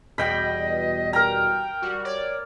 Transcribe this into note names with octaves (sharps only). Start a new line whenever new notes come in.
E2 B2 G3 D#5 G5 B5
A#4 G5 A#5
G3 F#4
C#5 D5